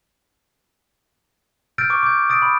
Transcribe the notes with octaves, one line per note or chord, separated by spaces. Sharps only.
E6 F6 G6 A6 D7
C#6 D6 D7
D6 G6
D#6 A6 D7
B5